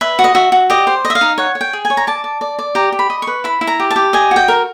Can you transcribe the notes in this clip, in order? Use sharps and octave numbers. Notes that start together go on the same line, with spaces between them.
B4 E5
F#4
D#5
F#4 E5
F#4
G4 D#5
C5
D#5
E5
F5
D#4
C#5 F#5
C#5
G5
G#4
G#5
C#5
A#5
D5 A5
D5
D5
D5
G4 A#5
G4
B5
D#5
C#6
B4
E4 B5
E4
A#5
G4
A5
G4
D#5 G#5
F#4
G5
A#4